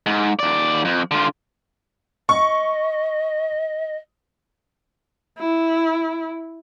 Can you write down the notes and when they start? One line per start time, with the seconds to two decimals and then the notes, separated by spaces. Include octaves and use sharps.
0.06 G#2
0.39 D#2 D5
0.85 F2
1.11 D3 F4
2.29 D#5 C#6
5.39 E4